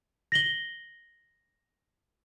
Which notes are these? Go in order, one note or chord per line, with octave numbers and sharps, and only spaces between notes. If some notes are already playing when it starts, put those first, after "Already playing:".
A#6 F#7 G7